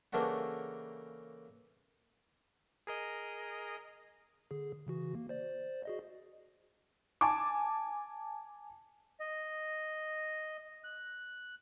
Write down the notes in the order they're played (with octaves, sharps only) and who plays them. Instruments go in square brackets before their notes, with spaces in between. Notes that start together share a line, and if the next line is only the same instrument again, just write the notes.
[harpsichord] C#3 E3 A3 A#3 D4 F#4
[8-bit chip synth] G#4 A#4 D#5
D3 G#4
C#3 E3 F#4
A#3
C5 D5
F#4 G#4 D#5
[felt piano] G#5 A5 D6
[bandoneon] D#5
F#6